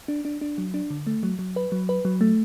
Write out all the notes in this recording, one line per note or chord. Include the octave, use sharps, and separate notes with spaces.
D4
D4
D4
F#3
D4
D3
A3
F#3
F#3
B4
F#3
B4
F#3
A3